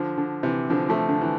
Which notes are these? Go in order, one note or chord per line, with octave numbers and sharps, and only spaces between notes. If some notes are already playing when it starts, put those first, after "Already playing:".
Already playing: D3 F3
D3
C3 E3
D3 F3
F3 A3
D3
E3